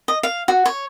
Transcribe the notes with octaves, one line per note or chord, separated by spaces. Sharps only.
D#5
F5
F#4
C#5